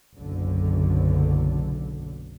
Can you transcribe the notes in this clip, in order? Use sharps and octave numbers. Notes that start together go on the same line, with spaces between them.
F#1 B1 D3